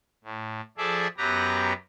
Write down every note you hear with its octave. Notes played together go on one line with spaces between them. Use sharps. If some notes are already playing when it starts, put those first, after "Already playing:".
A2
F3 G#4 A4 D5 E5
F#2 F#3 B3 G4 B4 A#5